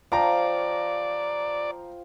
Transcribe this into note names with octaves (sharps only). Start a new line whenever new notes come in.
F3 D5 F5 G5 A#5